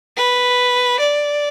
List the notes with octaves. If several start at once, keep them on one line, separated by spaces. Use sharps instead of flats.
B4
D5